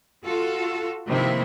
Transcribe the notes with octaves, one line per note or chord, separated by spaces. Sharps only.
F4 F#4 A4
G2 C3 D#3 F3 A#3 E4